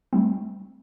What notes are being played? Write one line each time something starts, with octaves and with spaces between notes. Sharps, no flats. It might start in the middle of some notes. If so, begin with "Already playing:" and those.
G3 A3 C4